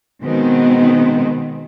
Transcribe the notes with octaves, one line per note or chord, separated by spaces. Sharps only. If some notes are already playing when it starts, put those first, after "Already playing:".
B2 D#3 G#3 B3 C4